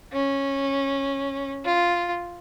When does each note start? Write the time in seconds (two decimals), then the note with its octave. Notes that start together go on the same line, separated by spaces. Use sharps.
0.12 C#4
1.65 F4